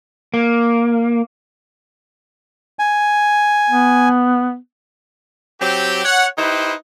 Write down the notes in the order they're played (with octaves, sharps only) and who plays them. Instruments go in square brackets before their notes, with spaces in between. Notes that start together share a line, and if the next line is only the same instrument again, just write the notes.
[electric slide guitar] A#3
[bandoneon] G#5
[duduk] B3
[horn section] F#3 C4 G4
C#5 F#5
D#4 E4 G4 B4 C5